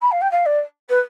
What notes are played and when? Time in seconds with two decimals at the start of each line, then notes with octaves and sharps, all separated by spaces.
0.01 B5
0.11 F5
0.21 G5
0.31 F5
0.45 D5
0.89 B4